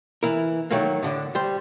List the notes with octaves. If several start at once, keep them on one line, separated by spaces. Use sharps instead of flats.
E3 E4 A#4
D#3 E3 F#3 A3 A#3
A2 D3 D4
G3 C5